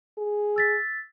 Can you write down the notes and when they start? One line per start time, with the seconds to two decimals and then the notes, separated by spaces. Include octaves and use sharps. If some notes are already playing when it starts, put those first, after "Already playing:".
0.18 G#4
0.56 E6 A6 B6